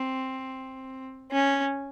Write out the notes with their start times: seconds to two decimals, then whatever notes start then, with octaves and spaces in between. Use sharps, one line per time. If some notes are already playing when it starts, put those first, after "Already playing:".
Already playing: C4
1.32 C#4